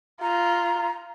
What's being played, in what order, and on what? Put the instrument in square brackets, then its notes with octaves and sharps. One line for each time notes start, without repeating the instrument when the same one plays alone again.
[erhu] F4 [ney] A#5